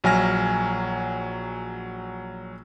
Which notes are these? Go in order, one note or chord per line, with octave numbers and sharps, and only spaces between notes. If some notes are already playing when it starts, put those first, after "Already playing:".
A#1 F#3 G#5 F6 A#6